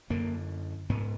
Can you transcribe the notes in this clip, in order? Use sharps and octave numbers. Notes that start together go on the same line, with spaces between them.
F#2 D3 A#3
G#2 B3